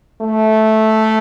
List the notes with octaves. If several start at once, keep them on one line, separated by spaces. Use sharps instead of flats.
A3